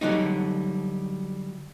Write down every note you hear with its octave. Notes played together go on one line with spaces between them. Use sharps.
D3 F#3 G3 D#4